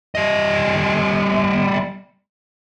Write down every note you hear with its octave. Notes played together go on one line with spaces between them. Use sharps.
G3 D#5